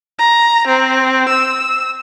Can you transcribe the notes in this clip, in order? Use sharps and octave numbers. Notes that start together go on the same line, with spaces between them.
A#5
C4
E6